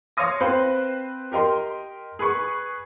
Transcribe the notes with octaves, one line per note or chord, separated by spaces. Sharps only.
C#5 F5 C6 D#6 A#6
C4 B4 C5 F5 C6
G4 A#4 D#5 C6
G#4 B4 B5 C#6